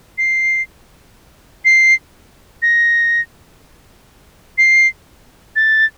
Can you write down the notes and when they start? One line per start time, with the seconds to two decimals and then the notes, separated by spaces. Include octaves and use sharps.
0.18 C7
1.65 C7
2.62 A#6
4.58 C7
5.56 A6